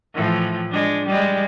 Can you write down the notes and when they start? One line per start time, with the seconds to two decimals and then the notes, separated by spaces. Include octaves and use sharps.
0.14 A2 E3 F3
0.71 G#3 D4
1.06 G3 G#3